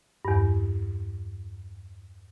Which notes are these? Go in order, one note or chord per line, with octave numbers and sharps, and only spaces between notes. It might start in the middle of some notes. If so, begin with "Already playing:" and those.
E2 G2